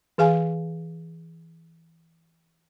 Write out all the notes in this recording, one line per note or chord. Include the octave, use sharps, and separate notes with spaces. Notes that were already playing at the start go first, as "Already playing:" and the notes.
E3 G#4 F5 G#5